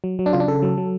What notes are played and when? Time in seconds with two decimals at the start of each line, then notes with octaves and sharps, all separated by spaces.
0.04 F#3
0.19 F#3
0.26 D4
0.33 C#3 F4
0.40 D4
0.48 C#3 A4
0.62 F#3
0.77 F#3